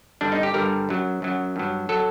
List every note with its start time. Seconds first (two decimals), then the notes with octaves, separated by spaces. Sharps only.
0.21 G2 D3 G3 D4
0.32 D#4
0.43 G4
0.54 G2 D3 G3 A#4
0.89 F#2 F#3
1.22 F#2 F#3
1.56 G2 F#3
1.89 F#3 A4